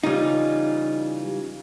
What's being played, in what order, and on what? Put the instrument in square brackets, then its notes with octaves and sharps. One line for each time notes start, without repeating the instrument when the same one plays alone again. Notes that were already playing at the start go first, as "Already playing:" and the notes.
[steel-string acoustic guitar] C#3 E3 F4 [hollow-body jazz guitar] G3 D#4